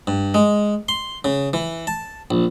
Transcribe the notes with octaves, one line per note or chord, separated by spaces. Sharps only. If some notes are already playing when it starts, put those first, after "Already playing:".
G2
G#3
C6
C#3
E3
A5
A#1